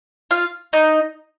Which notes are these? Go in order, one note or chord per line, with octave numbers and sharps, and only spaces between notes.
F4 F5
D#4 D#5